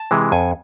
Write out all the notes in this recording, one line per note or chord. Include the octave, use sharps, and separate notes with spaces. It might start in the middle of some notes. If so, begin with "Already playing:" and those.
Already playing: A5
C3 E3 G#3
F2 G#5